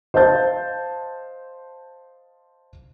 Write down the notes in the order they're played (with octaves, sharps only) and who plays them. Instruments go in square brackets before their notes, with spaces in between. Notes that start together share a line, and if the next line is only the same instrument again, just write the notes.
[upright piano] C5 D#5 F5 A5 G6 A6